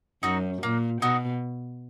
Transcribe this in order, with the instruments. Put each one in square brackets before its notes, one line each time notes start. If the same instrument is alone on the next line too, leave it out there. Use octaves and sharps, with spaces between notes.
[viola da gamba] F#2 [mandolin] D#4 F#4
[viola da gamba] A#2 [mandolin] A#3
[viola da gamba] B2 [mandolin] D#4 F#4